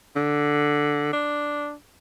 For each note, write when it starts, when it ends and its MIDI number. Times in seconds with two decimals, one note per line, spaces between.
0.16 1.09 50
1.13 1.73 62